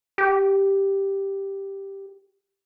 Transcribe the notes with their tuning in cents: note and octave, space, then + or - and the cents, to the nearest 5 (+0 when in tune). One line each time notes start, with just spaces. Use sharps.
G4 +0